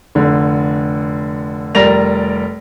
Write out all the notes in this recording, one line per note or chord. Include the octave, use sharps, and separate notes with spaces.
F1 D3
F1 G3 A#4 D5 A#6 F7